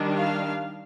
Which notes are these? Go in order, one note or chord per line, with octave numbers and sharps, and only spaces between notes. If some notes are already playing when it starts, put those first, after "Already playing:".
Already playing: D#3 G3 D4
F5